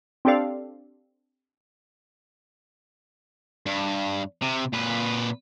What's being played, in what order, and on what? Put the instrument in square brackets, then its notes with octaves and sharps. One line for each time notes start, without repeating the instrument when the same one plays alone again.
[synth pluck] C4 D4 G4 A4 D5 F5
[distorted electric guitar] G2
C3
A#2 B4